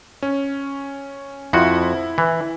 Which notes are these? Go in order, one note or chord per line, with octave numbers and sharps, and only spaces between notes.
C#4
F2 F3 E4 F#4
E3